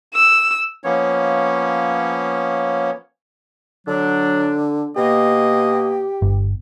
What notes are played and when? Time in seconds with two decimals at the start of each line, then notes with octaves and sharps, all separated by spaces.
0.15 E6
0.83 F3 A#3 B3 C#4 C#5
3.88 D3 F#3 D4
4.96 B2 A#3 G4 D#5
6.22 G1